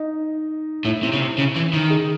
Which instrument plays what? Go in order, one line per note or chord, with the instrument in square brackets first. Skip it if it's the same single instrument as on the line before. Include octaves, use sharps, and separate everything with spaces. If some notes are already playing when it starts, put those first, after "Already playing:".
Already playing: [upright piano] D#4
[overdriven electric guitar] A2 [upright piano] E4
[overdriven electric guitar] C3
C#3
C3
C#3
E3
D#3
[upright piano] G#4